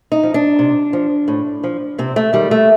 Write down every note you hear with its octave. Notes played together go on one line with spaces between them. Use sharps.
D#4
F3
D4
C3
F3
A2
F3
C3 C4
A3
D#3 G3
A3